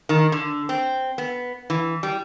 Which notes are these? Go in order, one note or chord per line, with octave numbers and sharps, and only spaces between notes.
D#3
D3
C4
B3
E3
G3